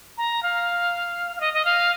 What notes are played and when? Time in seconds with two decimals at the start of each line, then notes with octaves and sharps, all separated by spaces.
0.17 A#5
0.43 F5
1.36 F5
1.40 D#5
1.54 D#5
1.65 F5